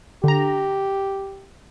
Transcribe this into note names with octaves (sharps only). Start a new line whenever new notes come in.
D3 G4 A#5